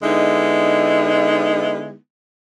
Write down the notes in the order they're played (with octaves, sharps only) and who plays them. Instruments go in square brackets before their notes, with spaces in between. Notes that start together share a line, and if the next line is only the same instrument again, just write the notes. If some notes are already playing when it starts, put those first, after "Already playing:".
[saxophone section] D3 G#3 B3 D#4 E4